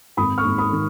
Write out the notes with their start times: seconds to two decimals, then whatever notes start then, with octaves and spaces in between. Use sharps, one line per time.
0.17 G#1 B5 D#6
0.38 C#6 F6
0.45 G#2
0.58 B5 D#6
0.73 D#3